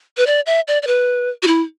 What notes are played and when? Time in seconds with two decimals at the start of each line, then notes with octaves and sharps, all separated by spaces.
0.17 B4
0.27 D5
0.46 E5
0.68 D5
0.82 D5
0.87 B4
1.43 F#4
1.47 E4